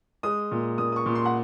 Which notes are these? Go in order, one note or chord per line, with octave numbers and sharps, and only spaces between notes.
G#3 D#6
A#2
A#2 D#6
D#6
C#6
A#2
C6
F#5